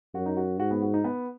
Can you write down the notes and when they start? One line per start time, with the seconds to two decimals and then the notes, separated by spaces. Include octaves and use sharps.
0.14 F#2 F#4
0.26 D#4
0.37 F#4
0.60 G#2 F#4
0.71 B3
0.82 F#4
0.94 D#4
1.04 B3